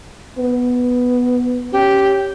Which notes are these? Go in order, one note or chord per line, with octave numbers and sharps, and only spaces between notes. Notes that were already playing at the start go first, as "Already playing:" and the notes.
B3
C#4 G4